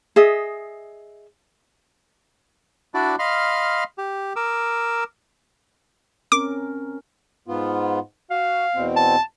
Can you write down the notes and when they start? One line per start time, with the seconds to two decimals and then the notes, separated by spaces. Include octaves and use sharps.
0.16 G#4 D#5 E5
2.94 D4 E4 F#4 D5
3.19 D#5 F5 B5 C6 F6
3.98 G4
4.36 A#4 D6 E6
6.32 C4 C#4 A#4 D6
7.48 G#2 B3 F4
8.31 F#4 F5
8.75 E2 B2 C4
8.97 A5